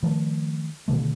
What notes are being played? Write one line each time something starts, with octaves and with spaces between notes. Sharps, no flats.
D#3 F3 A3
B2 D3 D#3 A3